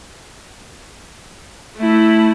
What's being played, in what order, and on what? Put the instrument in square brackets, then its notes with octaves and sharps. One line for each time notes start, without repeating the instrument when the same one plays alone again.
[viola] A3 E4